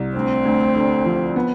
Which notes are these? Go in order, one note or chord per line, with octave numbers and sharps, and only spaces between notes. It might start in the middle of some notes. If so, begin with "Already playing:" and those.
Already playing: C2
D2 C4
D2
D3
F3
B3